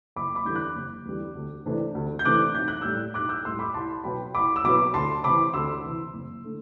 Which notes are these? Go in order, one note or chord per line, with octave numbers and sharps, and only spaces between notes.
F#1 B5 D6
B5 D6
E2 D3 G3 G6
D6 F#6
F#1
E2 D3 G3
D2
C3 E3 A3 D4
D2
G6
C3 E3 A3 D4 D6 F#6
B1 G6
F#6
A2 G3 E6 G6
B1 D6 F#6
E6 G6
A2 G3 C6 E6
B5 D6
C2 A5 C6
B2 F#3 B3 G5 B5
C2 B5 D6
E6
B2 F#3 B3 B5 D6
D2 A5 C6
C3 E3 B5 D6
D2 C6 E6
C3 E3
F#1
D3 A3